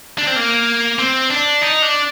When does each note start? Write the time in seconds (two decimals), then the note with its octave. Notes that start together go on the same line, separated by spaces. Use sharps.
0.18 D4
0.27 C4
0.36 A#3
0.99 C4
1.30 D4
1.62 D#4
1.82 D4